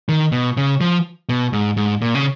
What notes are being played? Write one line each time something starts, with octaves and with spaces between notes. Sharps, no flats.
D#3
B2
C#3
F3
B2
G#2
G#2
A#2
C#3